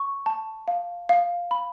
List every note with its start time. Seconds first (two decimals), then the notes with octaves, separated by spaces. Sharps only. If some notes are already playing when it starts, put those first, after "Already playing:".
Already playing: C#6
0.26 A5
0.68 F5
1.09 F5
1.51 B5